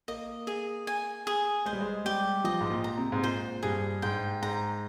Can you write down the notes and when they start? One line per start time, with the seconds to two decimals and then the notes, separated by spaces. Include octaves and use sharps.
0.08 A#3 D#5
0.47 G#4
0.87 G#5
1.27 G#4
1.66 G#3 C5
1.73 G3
1.81 G#3
2.05 G3 G4
2.44 F3 D#5
2.61 G#2
2.70 A#2
2.84 A#5
2.98 C3
3.12 G#2
3.23 A#2 C5
3.63 G2 G#4
4.02 G#2 G5
4.42 G#2 A#5